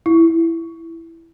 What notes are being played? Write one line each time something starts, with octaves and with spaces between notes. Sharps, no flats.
E4